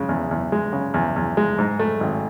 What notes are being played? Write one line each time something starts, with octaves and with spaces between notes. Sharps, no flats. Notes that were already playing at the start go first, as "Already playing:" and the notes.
Already playing: C#3 G#3
E2
E2
G#3
C#3
E2
E2
G#3
G#2
A3
G#1